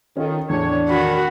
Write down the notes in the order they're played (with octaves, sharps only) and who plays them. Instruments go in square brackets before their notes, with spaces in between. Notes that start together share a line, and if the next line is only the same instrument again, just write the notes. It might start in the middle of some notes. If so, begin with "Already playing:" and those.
[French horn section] D#3 [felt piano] C#4 F4 A4
[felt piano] E2 A2 [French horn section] D4 [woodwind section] C#5
[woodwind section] D#3 B5 [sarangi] F#4